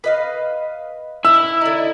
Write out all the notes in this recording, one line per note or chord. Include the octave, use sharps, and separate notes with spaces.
B4 D#5 F5
E4 E6
D3 D#4